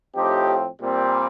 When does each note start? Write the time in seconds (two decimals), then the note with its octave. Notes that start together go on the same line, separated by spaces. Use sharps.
0.16 A2 F3 C4 D#4 G4
0.80 A#2 G3 C4